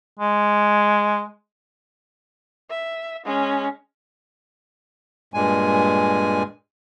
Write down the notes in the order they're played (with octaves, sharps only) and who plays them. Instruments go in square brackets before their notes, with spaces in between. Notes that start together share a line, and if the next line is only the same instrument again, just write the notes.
[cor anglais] G#3
[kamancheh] E5
G#3 C#4
[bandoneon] G2 A#2 G#3 G#5